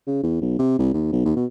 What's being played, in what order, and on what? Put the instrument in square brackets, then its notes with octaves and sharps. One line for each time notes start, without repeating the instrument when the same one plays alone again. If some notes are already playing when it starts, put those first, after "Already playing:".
[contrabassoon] C#3
E2
B1
C3
C2
D#2
B1
D#2
B2